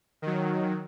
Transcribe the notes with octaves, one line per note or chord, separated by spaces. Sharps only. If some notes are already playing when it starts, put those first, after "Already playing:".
D#3 F#3